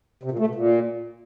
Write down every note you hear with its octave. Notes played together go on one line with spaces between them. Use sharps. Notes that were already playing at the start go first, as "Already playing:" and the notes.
C3
A#2
A3
B2
A#2